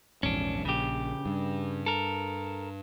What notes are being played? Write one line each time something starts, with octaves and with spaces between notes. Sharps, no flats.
A#1 E2 G#2 C#4 D4
A#1 C#3 G4
G2
A4 A#4